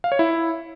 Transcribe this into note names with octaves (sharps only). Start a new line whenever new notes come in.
F5
C#5
E4